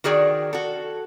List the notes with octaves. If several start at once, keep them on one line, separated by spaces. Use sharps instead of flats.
D#3 F#4 G#4 D5 G5
F#4 A4